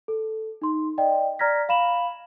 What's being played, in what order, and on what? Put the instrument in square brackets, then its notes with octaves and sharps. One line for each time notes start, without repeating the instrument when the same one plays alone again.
[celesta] A4
D#4 C6
D5 D#5 G5
D5 A#5 F6 G#6 A#6 B6
F5 B5 E7 F#7